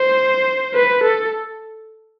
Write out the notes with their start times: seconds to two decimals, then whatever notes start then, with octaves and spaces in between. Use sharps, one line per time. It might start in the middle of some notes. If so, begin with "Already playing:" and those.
Already playing: C5
0.74 B4
1.03 A4